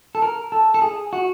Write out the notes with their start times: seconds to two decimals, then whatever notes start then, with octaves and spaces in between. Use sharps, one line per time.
0.15 A4
0.22 A#4
0.52 A4
0.74 A4
0.82 G#4
1.13 F#4